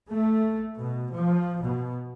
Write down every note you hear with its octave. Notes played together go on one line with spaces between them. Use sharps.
A3
B2
F3
B2